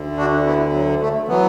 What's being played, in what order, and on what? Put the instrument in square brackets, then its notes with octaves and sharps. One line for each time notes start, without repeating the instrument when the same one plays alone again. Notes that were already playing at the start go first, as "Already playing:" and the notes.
Already playing: [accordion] D2 D3
D4 F#4
B3 E4
F#3
A3
E3 F#3 B3